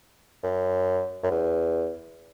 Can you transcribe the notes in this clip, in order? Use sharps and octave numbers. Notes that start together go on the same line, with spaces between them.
F#2
F#2
E2